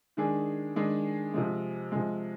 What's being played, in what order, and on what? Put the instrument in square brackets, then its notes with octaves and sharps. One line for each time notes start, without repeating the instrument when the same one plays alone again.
[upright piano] D#3 G#3 D4 G#4
D#3 G#3 D4 G#4
C3 F3 G#3
C3 F3 G#3